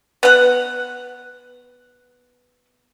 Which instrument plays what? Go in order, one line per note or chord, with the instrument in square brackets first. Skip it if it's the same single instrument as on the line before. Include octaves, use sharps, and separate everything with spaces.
[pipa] B3 F#5